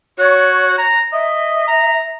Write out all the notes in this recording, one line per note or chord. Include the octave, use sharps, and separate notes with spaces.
F#4 C#5
A#5
D#5 E5
A#5